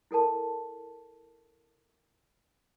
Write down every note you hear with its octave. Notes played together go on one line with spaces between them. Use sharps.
E4 A4 A#4 A5